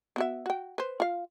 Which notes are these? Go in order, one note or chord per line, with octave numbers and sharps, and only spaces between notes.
B3 F#4 E5
F#4 G5
B4 C5
F4 F5